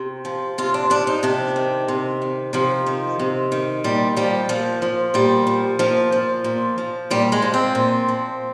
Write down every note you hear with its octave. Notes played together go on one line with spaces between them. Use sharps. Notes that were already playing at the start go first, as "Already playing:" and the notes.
Already playing: C3
F3
C3 F4
D4
F3 D4
D#4
C3 D4
D#3
C3
D#3
C3 F3
D#3
C3
D#3
A#2 G3
F3 G3
A#2 F3
F3
A#2 G3
F3
A#2 F3
F3
A#2
F3
A#2 G3
G#3
F3
C4
A#2
F3